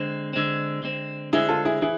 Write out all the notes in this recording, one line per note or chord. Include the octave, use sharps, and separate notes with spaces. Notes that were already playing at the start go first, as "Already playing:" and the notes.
Already playing: D3 G#3 C4
D3 G#3 C4
D3 G#3 C4
D3 G#3 C4 E4 G#4
F4 A4
E4 G#4
E3 E4 G#4